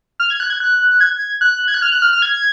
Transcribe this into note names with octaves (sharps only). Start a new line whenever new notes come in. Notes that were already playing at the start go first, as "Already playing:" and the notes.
F6
G#6
F#6
G#6
F#6
G#6
F#6
G#6
F#6
F6
F#6
F6
F6
G#6